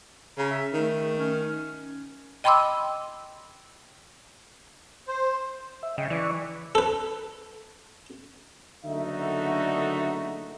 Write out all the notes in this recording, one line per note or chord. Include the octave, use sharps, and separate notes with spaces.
C#3 A#5
E5
D#3 A3
C#4
D#5 G5 B5 C6 D6 E6
C5
E5
C#3 D#5 G5
E3 D5 C#6
A4 B4
F#1 D3 A3 D#4 F#4 E5